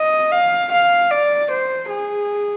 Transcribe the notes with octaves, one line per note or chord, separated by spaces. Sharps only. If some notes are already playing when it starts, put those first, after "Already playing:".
Already playing: D#5
F5
F5
D5
C5
G#4